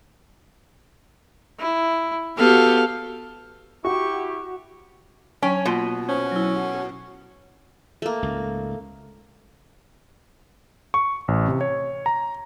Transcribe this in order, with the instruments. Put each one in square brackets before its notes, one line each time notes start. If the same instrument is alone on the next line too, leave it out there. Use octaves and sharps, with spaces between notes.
[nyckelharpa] E4
[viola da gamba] B3 F#4 G4 [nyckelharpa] A4 F5
[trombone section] E4 G4 [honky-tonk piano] F#4 [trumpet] C#6
[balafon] F#3 G5 C#6 [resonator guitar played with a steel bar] C#4
[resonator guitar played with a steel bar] B2 [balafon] A#3 F4 C6
[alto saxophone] C#4 [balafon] C5
[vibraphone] F#3 E4
F#5
[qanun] A3 A#3
[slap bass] C#2 G#2
[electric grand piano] C#6
A1
C3
C#5
A#5